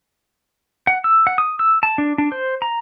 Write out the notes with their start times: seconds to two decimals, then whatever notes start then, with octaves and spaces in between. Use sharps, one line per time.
0.87 F#5
1.04 E6
1.27 F#5
1.38 D#6
1.59 E6
1.83 A5
1.98 D4
2.18 D4
2.32 C5
2.62 A#5